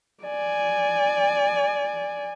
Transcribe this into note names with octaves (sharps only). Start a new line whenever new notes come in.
D5 G#5